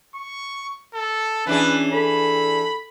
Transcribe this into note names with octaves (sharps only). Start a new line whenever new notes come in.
C#6
A4
E3 C#4 D4 G#4 B4
A4 B5